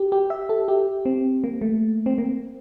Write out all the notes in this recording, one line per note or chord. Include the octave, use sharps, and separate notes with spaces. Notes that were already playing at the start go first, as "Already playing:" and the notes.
Already playing: G4
G4
E5
A4
G4
C4
A#3
A3
C4
A#3